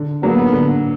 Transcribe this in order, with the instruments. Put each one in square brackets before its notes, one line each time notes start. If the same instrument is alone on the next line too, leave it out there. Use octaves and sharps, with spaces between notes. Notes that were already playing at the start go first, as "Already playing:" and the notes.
Already playing: [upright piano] D3
[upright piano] F#3 A#3 [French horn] B3
[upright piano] D3